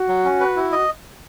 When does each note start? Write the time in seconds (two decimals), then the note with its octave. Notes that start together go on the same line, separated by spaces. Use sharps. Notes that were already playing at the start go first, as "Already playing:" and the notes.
Already playing: F#4
0.08 F#3
0.25 C#4
0.40 B4
0.56 E4
0.72 D#5